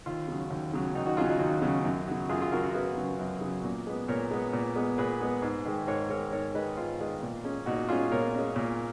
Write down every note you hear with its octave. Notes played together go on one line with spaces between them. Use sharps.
D#2 F4
C#3 F#3
D#2
C#3 F#3
D#2 D#4
D#4 F#4
C#3 F#3 F4 G#4
D#4 F#4
D#2 D#4
C#3 F#3
F#2
C#3 F#3
F#2 F4 G#4
F4 G#4
C#3 F#3 F#4 A#4
F#4 A#4
F#2 G#4 B4
C#3 F#3
F#2
C#3 F#3
A#2
G#3 B3
A#2 A#4 C#5
G#3 B3
A#2
G#3 B3
A#2 G#4 B4
G#3 B3
G#2
D#3 G#3
G#2 A#4 C#5
D#3 G#3 A#4 C#5
G#2 A#4 C#5
D#3 G#3 B4 D#5
G#2 F4
D#3 G#3
A#2
G#3 C#4
A#2 D#4 F#4
G#3 C#4 F4 G#4
A#2 A#4 C#5
G#3 C#4
A#2